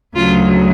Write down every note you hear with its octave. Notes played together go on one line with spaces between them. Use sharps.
D2 C#3 F#3 F4